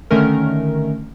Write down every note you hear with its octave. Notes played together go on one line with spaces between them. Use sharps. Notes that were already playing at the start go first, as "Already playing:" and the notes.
D3 D#3 A3 C#4 A#4